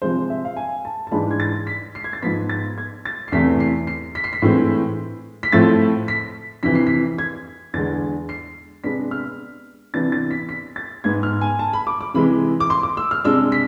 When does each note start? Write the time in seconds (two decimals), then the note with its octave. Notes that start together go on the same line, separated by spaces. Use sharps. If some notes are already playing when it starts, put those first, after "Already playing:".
0.02 C3 F3 G#3 C5
0.30 E5
0.45 F5
0.56 G#5
0.85 A5
1.07 A5
1.12 G#2 E3 G#3 D4 B5
1.31 G#6
1.40 A6
1.67 B6
1.95 C7
2.04 G#6
2.13 A6
2.22 G#2 F3 B3 B6
2.49 A6
2.78 G#6
3.05 A6
3.28 C7
3.32 E2 C3 E3 A3 B6
3.60 C7
3.87 C7
4.15 B6
4.24 C7
4.33 B6
4.42 A2 E3 G#3 C4
5.43 B6
5.52 A2 F3 A3 C4 A6
6.08 B6
6.63 F2 C3 E3 B6
6.75 C7
6.87 B6
7.18 G#6
7.74 E2 D3 G#3 A6
8.29 C7
8.84 C3 G#3 B3 D4 B6
9.11 F6
9.94 C3 E3 B3 D4 A6
10.12 A6
10.31 B6
10.49 B6
10.76 A6
11.04 G#2 G#3 B3 G#6
11.23 F6
11.41 G#5
11.59 A5
11.73 B5
11.87 D6
12.01 D6
12.14 C3 E3 G#3 B5
12.60 D6
12.70 C6
12.83 D6
12.97 E6
13.11 F6
13.25 C3 G#3 D4 E6
13.52 B6